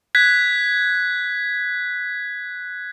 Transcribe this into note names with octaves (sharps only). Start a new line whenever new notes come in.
F#6 G#6 B6